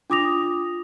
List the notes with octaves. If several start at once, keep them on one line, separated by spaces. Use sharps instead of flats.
D4 F4 D6 D#6 A#6 F7